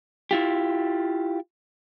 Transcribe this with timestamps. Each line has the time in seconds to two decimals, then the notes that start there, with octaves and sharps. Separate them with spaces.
0.31 E4 F4 G4